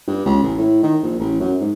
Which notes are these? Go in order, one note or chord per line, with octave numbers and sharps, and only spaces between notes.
G2
C#2
A1
A2
D#3
A#1
A1
F#2
G#2